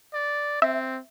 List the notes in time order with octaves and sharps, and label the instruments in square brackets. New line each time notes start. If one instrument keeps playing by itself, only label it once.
[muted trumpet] D5
[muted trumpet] C4 [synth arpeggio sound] E5